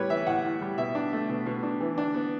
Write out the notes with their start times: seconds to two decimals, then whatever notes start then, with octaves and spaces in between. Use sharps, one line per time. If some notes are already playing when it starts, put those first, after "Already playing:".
Already playing: A2 G3 B3 B4 C#5
0.10 E3 E5
0.27 A2 F#5
0.44 A2
0.61 G3
0.78 B2 E5
0.95 D4
1.13 A3
1.29 B2
1.46 B2
1.63 D4
1.80 E3
1.98 D4
2.14 B3